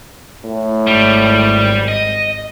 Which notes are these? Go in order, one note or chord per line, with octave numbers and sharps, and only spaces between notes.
A2
G#1 G3
D#5